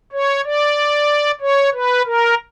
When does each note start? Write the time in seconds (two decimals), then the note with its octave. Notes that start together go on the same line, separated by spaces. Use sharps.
0.12 C#5
0.45 D5
1.41 C#5
1.73 B4
2.06 A#4